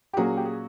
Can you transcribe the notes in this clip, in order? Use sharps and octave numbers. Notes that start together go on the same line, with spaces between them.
G4
A#2 F#3 A#3 C#4 F#4 G#4
G4
G#4